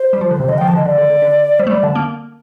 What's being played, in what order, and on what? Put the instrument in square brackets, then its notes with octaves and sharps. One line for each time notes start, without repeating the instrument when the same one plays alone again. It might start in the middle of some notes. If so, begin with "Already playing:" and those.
Already playing: [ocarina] C5
[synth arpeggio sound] G3
F3
D3
C3
[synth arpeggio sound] D3 [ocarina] D#5
[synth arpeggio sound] F3 [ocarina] G5
[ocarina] A5
[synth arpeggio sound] D3 [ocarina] D#5
[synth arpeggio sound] D3 [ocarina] D5
[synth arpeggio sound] D3
D3
D3
[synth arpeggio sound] G3 [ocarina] C5
[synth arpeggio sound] A3
[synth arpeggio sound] G3 [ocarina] D5
[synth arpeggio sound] D3 [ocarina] A5
[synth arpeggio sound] A#3